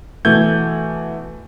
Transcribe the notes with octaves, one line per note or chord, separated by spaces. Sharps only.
B2 E3 A3 G6 G#6